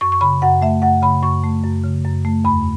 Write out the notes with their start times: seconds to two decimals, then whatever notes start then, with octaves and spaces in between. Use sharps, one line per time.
0.01 F#2 C#6
0.12 C#6
0.21 C#3 B5
0.42 F#2 F#5
0.62 A3 E5
0.82 F#2 F#5
1.02 C#3 B5
1.23 F#2 C#6
1.44 A3
1.63 F#2
1.84 C#3
2.05 F#2
2.25 A3
2.44 E2 B5